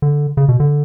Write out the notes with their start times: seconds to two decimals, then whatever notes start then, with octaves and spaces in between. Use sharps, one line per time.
0.02 D3
0.37 C#3
0.49 B2
0.60 D3